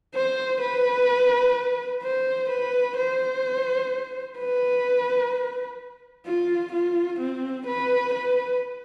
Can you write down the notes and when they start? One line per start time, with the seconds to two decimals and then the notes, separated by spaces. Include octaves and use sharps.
0.15 C5
0.61 B4
2.03 C5
2.50 B4
2.97 C5
4.38 B4
6.26 F4
6.73 F4
7.20 C4
7.66 B4
8.14 B4